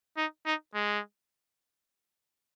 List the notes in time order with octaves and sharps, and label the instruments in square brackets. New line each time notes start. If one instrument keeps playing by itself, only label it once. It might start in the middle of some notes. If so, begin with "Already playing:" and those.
[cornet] D#4
D#4
G#3